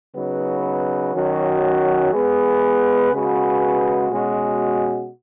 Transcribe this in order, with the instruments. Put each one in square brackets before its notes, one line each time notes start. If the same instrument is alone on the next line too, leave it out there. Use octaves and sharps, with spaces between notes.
[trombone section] C#3 F#3 B3 D#4 B4
D#3 F#3 C#4 F#4
G#3 B3 G#4 B4
C#3 G#3 B3 F#4 B4
B2 G#3 C#4 F#4